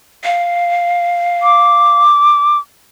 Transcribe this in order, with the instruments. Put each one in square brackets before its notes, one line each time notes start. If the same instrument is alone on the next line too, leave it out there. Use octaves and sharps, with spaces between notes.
[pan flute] F5
[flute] D6